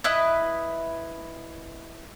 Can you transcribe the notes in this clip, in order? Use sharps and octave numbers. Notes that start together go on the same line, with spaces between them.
E4 B4 D#5